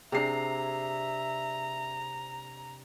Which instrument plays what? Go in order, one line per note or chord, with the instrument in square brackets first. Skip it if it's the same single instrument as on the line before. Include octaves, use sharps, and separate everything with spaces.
[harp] C3 D4 [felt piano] G#4 C7 [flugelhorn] E5 [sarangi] A#5